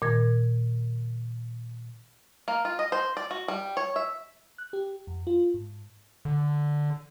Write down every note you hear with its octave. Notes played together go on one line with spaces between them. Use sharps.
A#2 D#3 A#4 G#6
A#3
F4
D#5
C5
D5
F#4
G3
C#5
E5
F#6
G4
F2
F4
G#2
D3